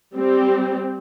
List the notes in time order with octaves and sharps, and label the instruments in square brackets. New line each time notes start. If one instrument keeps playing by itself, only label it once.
[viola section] G3 C4 G4